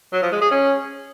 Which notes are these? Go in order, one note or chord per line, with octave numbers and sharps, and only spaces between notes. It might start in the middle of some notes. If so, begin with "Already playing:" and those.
F#3
F3
G#3
G#4
C#4